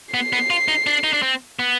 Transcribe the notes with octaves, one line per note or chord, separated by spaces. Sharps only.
B3 C7
B3
F4
D#4
D4
D#4
D4
C4
B3